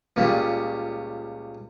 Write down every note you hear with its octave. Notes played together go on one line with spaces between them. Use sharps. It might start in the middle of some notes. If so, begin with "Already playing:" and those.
C#2 A#2 C#3 G3